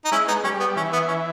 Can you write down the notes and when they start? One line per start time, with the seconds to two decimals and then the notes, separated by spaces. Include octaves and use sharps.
0.05 D#4
0.12 G#3 C#4 E4
0.28 B3 D#4
0.44 G3 C#4
0.60 B3
0.76 E3 C#4
0.93 B3
1.08 C#4